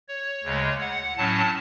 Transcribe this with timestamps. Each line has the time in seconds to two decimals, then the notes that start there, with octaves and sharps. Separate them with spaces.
0.08 C#5
0.44 D2 C#3 G#3
0.80 F#5
1.17 A2 F#3 C#4 A5